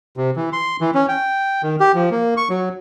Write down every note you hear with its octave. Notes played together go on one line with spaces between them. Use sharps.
C3
E3
C6
E3
C#4
G5
D#3
G4
F3
A#3
C#6
F#3